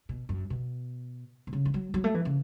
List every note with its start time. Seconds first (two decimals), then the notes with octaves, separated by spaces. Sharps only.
0.09 B2
0.29 F#2
0.50 B2
1.47 B2
1.53 C#3
1.65 E3
1.74 F#3
1.94 F#3
2.04 A3
2.15 E3
2.25 C#3